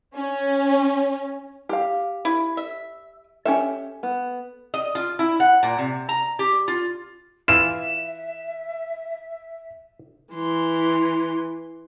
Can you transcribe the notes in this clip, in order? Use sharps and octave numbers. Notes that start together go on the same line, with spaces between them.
C#4
G4 F5
E4
E5
C#4 G4 A4 E5
B3
D#5
F4
E4
F#5
A#2
C3
A#5
G4
F4
E3 E4 F4 E5 E7
E3 C6